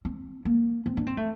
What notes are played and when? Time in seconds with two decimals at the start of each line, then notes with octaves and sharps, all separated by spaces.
0.05 C4
0.45 A#3
0.86 C4
0.97 D4
1.07 C4
1.17 A3